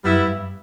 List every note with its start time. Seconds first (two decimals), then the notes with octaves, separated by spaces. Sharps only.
0.04 F#2 G3 B3 E4
0.27 G2